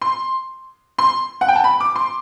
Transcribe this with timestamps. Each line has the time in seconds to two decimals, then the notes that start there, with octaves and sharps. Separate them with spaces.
0.02 C6
0.99 C6
1.41 F#5
1.48 G5
1.56 A5
1.64 B5
1.80 D6
1.96 C6